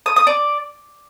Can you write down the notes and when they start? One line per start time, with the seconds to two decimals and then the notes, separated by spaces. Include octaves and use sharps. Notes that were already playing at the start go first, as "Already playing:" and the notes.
0.06 D#6
0.16 D#6
0.27 D5